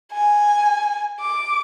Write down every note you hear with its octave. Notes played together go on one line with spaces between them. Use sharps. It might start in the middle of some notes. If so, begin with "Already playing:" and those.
G#5
D6